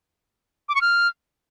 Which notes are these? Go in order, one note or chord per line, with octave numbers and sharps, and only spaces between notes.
D6
C#6
F6